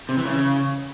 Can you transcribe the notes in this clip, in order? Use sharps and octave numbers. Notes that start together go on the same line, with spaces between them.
C3
E3
C#3